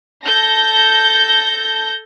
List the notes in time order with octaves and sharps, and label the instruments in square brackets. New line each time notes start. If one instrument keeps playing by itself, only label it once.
[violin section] A4 G6 A#6